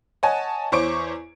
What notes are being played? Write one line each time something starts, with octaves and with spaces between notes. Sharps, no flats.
C#5 D#5 F#5 G#5 A5
E2 C5 C#5 C#6 D6 D7